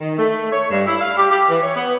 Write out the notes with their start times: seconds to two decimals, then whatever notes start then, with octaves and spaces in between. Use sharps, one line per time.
0.01 D#3
0.18 A3
0.52 C#5
0.71 G2
0.86 E4
1.01 F5
1.17 G4
1.31 G4
1.50 E3
1.62 C#5
1.76 B3